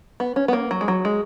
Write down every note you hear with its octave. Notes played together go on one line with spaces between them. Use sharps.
B3
C#4
B3
A#3
F#3
G#3
F#3
G#3